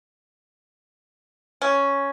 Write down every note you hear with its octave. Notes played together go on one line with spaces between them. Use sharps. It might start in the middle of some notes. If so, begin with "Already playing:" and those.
C#4